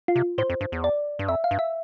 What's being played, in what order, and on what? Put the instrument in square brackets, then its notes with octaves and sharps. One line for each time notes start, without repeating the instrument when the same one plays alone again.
[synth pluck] F4
[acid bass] C3
[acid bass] A2 [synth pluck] C5
[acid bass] F2
G2
E2
[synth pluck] D5
[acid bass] G2
[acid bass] F2 [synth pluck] E5
[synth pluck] F5
[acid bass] G2
[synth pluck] E5